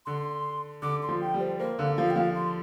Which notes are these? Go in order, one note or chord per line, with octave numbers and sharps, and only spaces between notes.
D3 C6
D3 D6
C6
F3
G5
G3
C5
A#3 C5
D3 F5
F3 F5
G5
F3 F5
C6